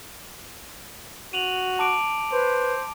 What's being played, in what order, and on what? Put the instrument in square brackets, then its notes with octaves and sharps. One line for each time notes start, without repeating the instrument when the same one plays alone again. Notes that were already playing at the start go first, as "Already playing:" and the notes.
[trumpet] F#4 [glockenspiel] D#7 F7 F#7
[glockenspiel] A5 D6 D7
[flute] B4 [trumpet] C5